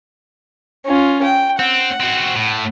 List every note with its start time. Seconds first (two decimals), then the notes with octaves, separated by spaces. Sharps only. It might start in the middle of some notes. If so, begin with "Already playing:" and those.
0.85 C#4 F4
1.23 G5
1.59 C4 F#5
2.00 C4 F#4
2.36 A2